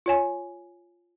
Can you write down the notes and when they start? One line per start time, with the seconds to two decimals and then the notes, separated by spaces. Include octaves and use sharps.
0.06 F4 C#5 G#5